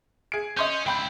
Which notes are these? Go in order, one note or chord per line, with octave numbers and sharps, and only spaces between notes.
G#4 D7
C#4 D#5 C6 G6
C#2 E4 G5 B5 G6